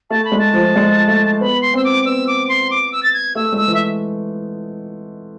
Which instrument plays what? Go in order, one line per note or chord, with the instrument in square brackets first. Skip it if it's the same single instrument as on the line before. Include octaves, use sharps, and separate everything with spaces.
[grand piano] A3 [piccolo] A5
[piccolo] B5
[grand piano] G#3
[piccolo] A5
[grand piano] F3
G#3
A3
[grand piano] B3 [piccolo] B5
[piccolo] C6
[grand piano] C4 [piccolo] E6
[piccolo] D6
[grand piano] B3 [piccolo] E6
[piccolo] D6
C6
D6
E6
A6
G#6
[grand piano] A3 [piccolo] E6
[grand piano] G#3 [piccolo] E6
[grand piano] E3
[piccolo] E5